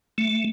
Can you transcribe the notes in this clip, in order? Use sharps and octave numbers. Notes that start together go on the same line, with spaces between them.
A3